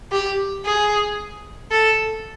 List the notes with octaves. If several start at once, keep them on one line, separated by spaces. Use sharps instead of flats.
G4
G#4
A4